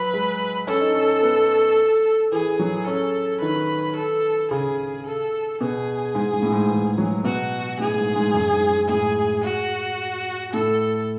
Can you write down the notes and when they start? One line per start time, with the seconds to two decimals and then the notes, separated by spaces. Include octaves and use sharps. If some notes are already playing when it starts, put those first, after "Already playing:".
Already playing: F#3 B4
0.14 G#3
0.67 C#4 A4
0.81 D#4
0.95 C#4
1.23 B3
2.32 E3 G#4
2.59 F#3
2.87 C#4 A4
3.41 D#3 B4
3.96 A4
4.51 C#3 G#4
5.06 A4
5.61 B2 G#4
6.15 G#2
6.33 G#2
6.42 A2
6.52 G#2
6.70 E3
6.98 F#3
7.24 B2 F#4
7.80 A2 G#4
7.98 G#2
8.16 G#2
8.34 F#2
8.53 G#2
8.70 G#2
8.89 A2 G#4
9.44 F#4
10.53 A2 A4